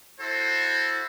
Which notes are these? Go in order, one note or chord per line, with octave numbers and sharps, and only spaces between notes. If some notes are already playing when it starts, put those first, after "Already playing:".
E4 F#4 A4 C5